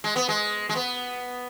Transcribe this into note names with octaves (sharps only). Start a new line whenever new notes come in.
G#3
B3
G#3
G#3
B3